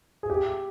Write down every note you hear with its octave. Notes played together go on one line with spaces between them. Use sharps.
G#4
G4